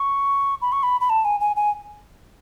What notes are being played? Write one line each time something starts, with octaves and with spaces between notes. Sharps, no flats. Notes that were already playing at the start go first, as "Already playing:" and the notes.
Already playing: C#6
B5
C#6
B5
B5
A5
G#5
G#5
G#5